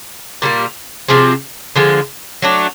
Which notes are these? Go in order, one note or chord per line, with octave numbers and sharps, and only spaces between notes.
A#2 G3 A#3
C3 F3 G#3 C4
D3 F3 G#3
F#3 A3 D4